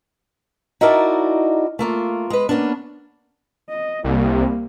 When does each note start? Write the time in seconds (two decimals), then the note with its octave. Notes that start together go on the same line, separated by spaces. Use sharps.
0.81 D#4 E4 F#4 A#4 D5 A5
1.79 A3 A#3 F4
2.30 G#3 B4
2.49 A#3 B3 C#4 D4
3.69 D#5
4.04 C2 G3 A#3